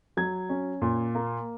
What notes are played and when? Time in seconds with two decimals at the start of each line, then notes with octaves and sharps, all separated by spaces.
0.17 F#3 G#6
0.49 C#4
0.82 A#2
1.15 A#3